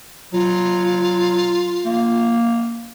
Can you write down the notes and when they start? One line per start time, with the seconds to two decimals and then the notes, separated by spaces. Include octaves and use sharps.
0.33 F#3 F4
1.85 A#3